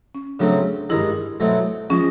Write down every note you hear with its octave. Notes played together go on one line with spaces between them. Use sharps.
C#4
C#3 F#3 A3 C4 D4
G2 D#3 G#3 E4
B2 F#3 A3 C4
F3 G#3 C#4